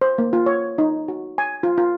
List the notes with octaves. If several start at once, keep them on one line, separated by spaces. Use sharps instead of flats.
C5
A#3
F4
C#5
D#4
F#4
G#5
F4
F4